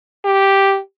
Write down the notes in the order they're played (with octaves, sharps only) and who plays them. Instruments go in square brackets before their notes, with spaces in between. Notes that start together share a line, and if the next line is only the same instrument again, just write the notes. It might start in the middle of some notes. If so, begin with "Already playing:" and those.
[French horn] G4